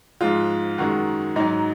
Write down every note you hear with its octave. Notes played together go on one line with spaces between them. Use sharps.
G#2 F3 G#3 F4
F#2 D#3 G#3 F#4
G#2 F#3 D#4